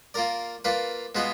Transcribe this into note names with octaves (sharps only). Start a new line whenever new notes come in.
A#3 F4 A#4 D5
A#3 F4 B4 D5
B2 G#3 B3 F4 B4